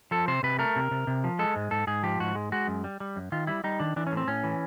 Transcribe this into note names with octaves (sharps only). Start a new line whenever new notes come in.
F3 A4
C3 C5
C3 B4
A3 A#4
C3
C3
C3
F3
G#3 A4
G#2
G#2 A4
G#2 G#4
F3 G4
G#2 F#4
G#3
G#3 F#4
F#2
G3
G3
F#2
D#3 F4
G3 E4
G3 D#4
D#3 D4
E3 D4
C#4
A2
C4
A2 C#4
E3